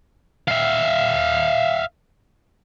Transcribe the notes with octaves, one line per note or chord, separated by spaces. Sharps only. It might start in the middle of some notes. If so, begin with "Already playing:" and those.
E5 F5